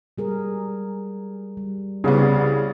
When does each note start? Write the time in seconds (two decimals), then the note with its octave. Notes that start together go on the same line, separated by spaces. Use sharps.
0.18 G3 G#4 A#4
1.57 G3
2.04 C2 C#3 B3 G4 C#5 D5